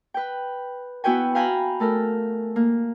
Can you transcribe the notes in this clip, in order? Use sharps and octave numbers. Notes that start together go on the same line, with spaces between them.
B4 G5
B3 E4 F#4 B4 G5 G#5
F5 G5 G#5 A#5 B5
A3 A4 A#4
A#3